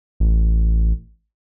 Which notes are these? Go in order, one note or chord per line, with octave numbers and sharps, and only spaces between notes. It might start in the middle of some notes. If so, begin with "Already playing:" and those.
A1